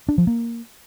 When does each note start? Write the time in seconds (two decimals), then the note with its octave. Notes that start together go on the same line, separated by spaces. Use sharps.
0.09 D4
0.18 F3
0.27 A#3